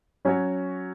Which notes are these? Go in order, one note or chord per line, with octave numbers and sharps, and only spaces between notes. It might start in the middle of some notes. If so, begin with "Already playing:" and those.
F#3 C#4 F#4 C#5